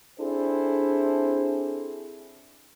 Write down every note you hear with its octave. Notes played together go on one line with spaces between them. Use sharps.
C4 D4 E4 G#4 A4 C5